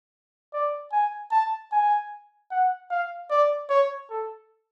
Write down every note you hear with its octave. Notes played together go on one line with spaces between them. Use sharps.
D5
G#5
A5
G#5
F#5
F5
D5
C#5
A4